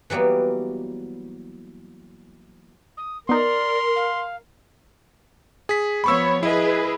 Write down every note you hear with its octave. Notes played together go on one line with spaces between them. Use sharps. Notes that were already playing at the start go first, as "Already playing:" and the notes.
E3 F#3 G3 A#3 B3
D#6
B3 D#4 A#4 D5 C6
F5
G#4 B6
F3 B3 C#5 B5 C#6 E6
E4 G#4 B4 D#5